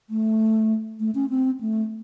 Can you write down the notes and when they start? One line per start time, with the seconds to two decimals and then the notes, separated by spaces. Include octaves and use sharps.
0.10 A3
1.00 A3
1.15 C#4
1.30 C4
1.61 A3